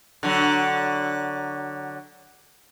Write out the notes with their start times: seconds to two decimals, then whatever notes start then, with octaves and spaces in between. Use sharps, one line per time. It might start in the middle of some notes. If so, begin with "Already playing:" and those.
0.23 D3 F#3